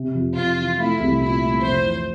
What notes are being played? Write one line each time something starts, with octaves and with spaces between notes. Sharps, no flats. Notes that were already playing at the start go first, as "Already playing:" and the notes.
Already playing: C3
F2
F2 F4
E3
A3 E4
C2
A#2 E4
A3
F2 C5
E3